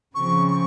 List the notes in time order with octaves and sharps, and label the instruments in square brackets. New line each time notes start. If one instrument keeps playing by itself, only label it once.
[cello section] C#3 F3 C4 [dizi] C#6
[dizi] C#6